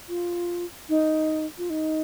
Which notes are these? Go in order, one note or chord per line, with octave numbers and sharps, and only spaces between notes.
F4
D#4
F4
D#4